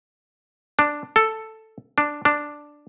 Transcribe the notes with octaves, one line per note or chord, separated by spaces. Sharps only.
D4
A4
D4
D4